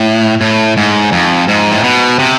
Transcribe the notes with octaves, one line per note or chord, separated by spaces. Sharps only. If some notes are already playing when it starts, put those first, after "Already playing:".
Already playing: A2
A2
G#2
F2
G#2
A2
B2
C3